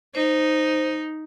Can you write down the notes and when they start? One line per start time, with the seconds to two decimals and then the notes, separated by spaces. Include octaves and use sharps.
0.15 D#4 C5